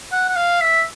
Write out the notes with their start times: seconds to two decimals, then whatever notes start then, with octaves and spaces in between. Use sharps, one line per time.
0.12 F#5
0.29 F#5
0.36 F5
0.61 E5